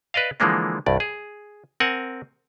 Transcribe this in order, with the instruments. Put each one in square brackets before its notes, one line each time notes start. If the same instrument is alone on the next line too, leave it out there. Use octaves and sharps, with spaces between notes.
[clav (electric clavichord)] B4 D5 D#5 F5
D3 E3 F3 G#3 A#3 D4
C2 G2 D5
G#4
C4 A#4 F#5 G#5